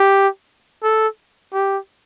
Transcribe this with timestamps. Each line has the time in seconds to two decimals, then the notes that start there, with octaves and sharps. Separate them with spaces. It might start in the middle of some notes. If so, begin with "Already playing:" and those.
Already playing: G4
0.83 A4
1.53 G4